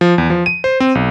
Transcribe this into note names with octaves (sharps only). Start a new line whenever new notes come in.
F3
E2
F3
D#7
C5
C4
B1